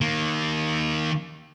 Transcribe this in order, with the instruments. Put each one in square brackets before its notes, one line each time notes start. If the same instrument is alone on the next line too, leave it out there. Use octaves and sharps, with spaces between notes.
[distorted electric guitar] D#3 A#3